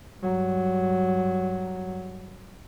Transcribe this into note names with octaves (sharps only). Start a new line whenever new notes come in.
G2 F#3